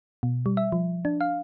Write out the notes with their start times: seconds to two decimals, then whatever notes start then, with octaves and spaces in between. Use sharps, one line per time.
0.23 B2
0.46 G3
0.57 E5
0.72 F3
1.05 D4
1.21 F5